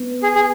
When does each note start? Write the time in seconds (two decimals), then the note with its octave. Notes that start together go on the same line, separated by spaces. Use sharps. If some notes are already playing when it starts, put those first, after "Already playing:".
Already playing: B3
0.23 G#4
0.35 G#4